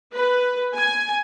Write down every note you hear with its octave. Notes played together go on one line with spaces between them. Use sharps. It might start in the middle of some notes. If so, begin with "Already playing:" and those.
B4
G#5